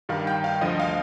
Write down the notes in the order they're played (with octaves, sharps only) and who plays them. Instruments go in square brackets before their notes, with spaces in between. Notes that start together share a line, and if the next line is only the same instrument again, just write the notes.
[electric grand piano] G2 D#3 G3 F5
G5
F5
D2 D3 F3 D#5
F5